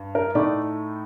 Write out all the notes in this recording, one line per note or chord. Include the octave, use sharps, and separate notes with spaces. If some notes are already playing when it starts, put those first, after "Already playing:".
Already playing: G2
A#4
A2 A3 D#4 D5